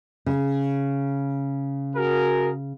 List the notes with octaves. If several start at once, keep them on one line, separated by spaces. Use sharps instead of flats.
C#3
F#4 G#4 A#4